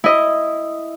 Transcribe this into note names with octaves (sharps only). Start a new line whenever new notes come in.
E4 D#5